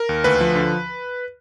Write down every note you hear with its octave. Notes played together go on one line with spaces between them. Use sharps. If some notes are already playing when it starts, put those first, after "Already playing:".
Already playing: A#4
D#2
D2 B4
F3
D3